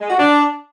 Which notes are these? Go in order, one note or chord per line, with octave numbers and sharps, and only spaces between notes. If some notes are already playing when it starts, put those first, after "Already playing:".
G#3
F#4
D4